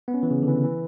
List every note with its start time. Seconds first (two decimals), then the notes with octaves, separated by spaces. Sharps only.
0.08 B3
0.14 C#4
0.23 E3
0.31 C#3
0.43 D3
0.48 E3
0.64 E3